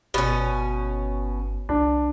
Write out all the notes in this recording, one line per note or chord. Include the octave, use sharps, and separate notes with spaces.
G1 B2 C#4
C2 D4